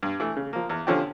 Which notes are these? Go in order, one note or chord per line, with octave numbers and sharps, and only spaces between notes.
G2
E3 A3
C#3
F3 A#3
E2
D3 F3 C#4 G4